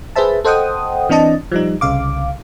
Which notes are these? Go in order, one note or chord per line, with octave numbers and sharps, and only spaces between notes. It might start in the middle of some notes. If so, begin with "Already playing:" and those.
G#4 B4 C5 E5 A5
A4 C5 D#5 F#5 G5 D#6
E3 C4 D4 D#5 A5
F3 G3 D#4
C2 C#3 F5 D6